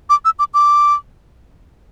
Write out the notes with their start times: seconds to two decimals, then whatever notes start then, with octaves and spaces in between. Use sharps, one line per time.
0.10 D6
0.25 E6
0.39 D6
0.54 D6